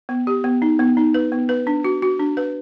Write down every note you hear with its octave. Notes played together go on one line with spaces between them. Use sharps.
B3
G4
B3
D#4
B3
D#4
B4
B3
B4
D4
F#4
F#4
D4
B4